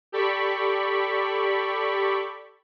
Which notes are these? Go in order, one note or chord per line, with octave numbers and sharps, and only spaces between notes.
G4 A4 D5 B5 C#6 B6